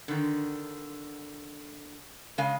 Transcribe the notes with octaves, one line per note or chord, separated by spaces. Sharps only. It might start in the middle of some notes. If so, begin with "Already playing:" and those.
D3 D#3
C#3 G#3 F5 G#5